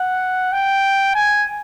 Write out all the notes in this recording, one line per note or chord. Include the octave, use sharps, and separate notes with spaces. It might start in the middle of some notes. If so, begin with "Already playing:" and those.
Already playing: F#5
G5
G#5